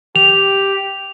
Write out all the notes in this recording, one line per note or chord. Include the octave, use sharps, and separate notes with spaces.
G4 F7